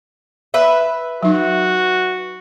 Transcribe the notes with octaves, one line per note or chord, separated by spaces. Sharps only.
B4 E5
F#3 D#4 F#4